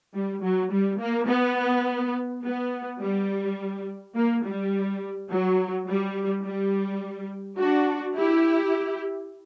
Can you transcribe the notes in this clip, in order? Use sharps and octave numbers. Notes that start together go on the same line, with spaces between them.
G3
F#3
G3
A#3
B3
B3
G3
A#3
G3
F#3
G3
G3
D4 F#4
E4 G4